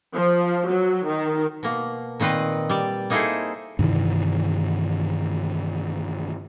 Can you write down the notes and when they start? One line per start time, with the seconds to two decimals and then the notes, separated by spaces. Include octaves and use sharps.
0.14 F3
0.67 F#3
1.07 D#3
1.63 B2 A#3
2.20 A#2 D#3 C4 B4 D#5
2.70 G3 D5
3.10 A#3 D#4 E4 G#4 A4 C5
3.79 G2 C3 D#3 E3